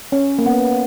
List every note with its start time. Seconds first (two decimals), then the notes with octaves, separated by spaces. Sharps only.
0.12 C#4
0.39 A#3
0.46 B3